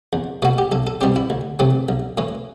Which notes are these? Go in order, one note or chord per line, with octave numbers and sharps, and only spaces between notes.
E2
B2 A3 F#4
G4
B1 A4
A4
B2 G3 C4 G4
E4
D2
C3 E3 A3 C4
B1
A2 E3